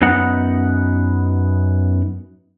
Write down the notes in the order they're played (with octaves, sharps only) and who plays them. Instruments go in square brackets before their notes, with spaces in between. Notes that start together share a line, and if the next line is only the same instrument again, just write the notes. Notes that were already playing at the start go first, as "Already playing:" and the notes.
[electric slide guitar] F#2 B3 D#4 F#5